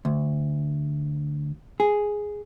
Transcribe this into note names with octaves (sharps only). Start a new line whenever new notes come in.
D2
G#4